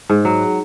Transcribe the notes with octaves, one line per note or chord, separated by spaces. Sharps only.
G#2
F#3